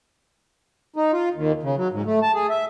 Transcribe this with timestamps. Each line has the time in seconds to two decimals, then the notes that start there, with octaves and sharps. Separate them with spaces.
0.96 D#4
1.12 F4
1.34 D#2
1.63 C#3
1.77 F#3
1.92 G#2
2.06 A3
2.23 A5
2.35 G#4
2.50 E5